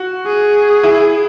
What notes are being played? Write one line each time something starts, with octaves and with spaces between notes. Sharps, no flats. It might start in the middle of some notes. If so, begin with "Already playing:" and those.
Already playing: F#4
G#4
E4